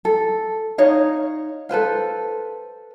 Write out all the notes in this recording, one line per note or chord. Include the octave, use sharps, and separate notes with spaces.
A4
D#4 C#5 F5
A4 B4 C5 F5